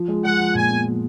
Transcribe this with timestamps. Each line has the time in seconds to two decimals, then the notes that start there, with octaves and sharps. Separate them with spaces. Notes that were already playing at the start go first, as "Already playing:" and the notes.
Already playing: F3
0.08 G#3
0.24 G#3 F#5
0.40 F3
0.55 A#2 G#5
0.71 B3
0.86 F3